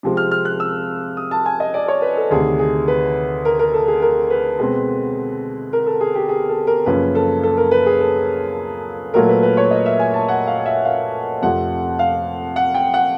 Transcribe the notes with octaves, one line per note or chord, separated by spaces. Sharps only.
C3 F3 G#3 C4
F6
F6
F#6
E6
D#6
A5
G#5
D#5
D5
C#5
B4
A4
D2 C3 D#3 G#4
G#4
B4
A#4
A#4
A4
G#4
A#4
B4
B2 G#3 C4
A#4
A4
G#4
G4
G#4
A4
A#4
F#2 C#3 F3 A#3 C#4 B4
A4
A4
A#4
B4
G#4
A4
A#2 F#3 A3 A#4
B4
B4
C#5
D#5
E5
G#5
A5
F#5
F5
E5
F5
F2 C3 F3 A3 F#5
F5
F#5
G5
F#5